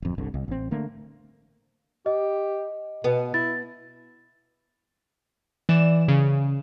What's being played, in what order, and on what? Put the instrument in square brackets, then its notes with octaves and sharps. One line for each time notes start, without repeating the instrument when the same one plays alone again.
[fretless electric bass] D1 F2
G1 C2 D3
C2
A1 C4
D3 A3 A#3
[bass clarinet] G4 [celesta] D#5
[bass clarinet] B2 [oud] B3
[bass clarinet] E4 [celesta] A6
[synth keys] E3 D5 E7
C#3